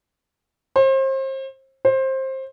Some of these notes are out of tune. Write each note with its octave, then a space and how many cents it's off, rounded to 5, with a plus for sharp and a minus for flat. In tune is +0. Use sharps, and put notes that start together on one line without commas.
C5 +35
C5 +20